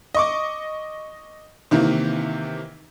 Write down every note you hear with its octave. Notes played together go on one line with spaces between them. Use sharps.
D#5 C#6 D6
C3 D#3 E3 A#3